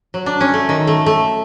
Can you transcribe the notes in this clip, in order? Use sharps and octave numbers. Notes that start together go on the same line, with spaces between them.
F#3
D4
C#4
A3
D#3
A3
A3